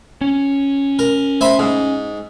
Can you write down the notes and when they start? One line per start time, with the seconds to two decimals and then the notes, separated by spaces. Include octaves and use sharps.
0.21 C#4
0.99 A#4
1.41 C5 E5 B5
1.59 G#2